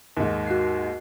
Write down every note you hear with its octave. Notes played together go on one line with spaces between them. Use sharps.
D#2 G#2
F#4 C7